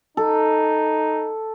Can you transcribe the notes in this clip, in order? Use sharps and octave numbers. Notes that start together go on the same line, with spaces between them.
D#4 A4